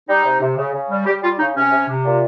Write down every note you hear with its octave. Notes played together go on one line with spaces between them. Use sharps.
G3 D#4
C3
C3
C#3
C#3
G3
G3 G4
G3 F4
C#3 D#4
C3 C#4
C3
C3
A#2